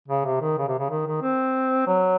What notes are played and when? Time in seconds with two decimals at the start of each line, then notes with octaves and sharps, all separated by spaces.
0.08 C#3
0.25 C3
0.41 D#3
0.58 C#3
0.68 C3
0.79 C#3
0.90 D#3
1.07 D#3
1.23 C4
1.87 F#3